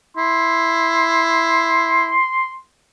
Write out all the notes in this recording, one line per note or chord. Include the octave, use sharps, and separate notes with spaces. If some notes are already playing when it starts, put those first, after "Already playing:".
E4 C6